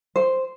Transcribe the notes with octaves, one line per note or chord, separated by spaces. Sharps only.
C5